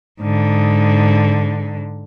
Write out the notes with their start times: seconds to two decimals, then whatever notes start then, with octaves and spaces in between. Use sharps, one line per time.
0.20 G#2 D3